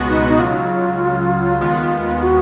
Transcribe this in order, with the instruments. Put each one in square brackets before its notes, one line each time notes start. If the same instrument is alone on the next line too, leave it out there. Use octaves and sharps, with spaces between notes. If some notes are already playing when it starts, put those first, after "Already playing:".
Already playing: [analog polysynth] C#2 B2 G#3 B3 F#4
[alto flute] D#4
D#4
[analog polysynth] C#2 C#3 F#3 [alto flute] F4
[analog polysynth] D#2 D#3 G#3 B3
[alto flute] F#4